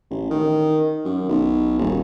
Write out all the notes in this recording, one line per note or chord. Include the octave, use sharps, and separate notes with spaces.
A1
D#3
F#2
B1
D#1